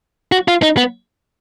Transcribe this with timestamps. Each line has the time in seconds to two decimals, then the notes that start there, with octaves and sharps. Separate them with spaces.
0.32 F#4
0.48 F4
0.62 D#4
0.77 B3